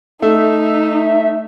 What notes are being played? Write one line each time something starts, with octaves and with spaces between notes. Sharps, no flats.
A3 D#4 E5